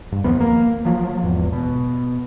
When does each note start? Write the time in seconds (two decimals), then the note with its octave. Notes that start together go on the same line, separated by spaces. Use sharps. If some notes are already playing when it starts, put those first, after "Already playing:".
0.12 G2
0.24 D#2 D#3 F3 B3
0.40 A#3
0.85 F3 F#3
1.23 G#1 E2
1.53 B2